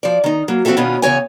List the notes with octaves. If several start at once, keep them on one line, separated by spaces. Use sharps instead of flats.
F3 D5
D#3 D#4
F#3 A#3
F3 C4 F#4 G4 A4 E5
B2 D#3 B3 C#4 D4 F4
E2 C#3 G#3 C#5 G#5